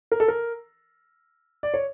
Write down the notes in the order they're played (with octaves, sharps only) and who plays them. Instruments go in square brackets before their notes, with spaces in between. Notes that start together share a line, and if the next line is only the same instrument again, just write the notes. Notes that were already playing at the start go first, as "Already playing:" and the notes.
[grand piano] A#4
A4
A#4
D5
C#5